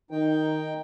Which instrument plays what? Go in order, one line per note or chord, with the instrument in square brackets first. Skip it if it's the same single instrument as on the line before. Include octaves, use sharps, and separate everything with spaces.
[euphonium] D#3 [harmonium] D#4 G5